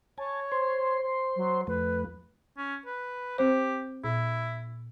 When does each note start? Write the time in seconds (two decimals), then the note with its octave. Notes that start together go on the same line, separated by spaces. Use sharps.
0.18 C#5 G#5 A5
0.52 C5 C6
1.36 F#3
1.67 F2 F3 A3 B4
2.58 C#4
2.86 B4
3.38 C4 G4 C5
4.04 A#2 E4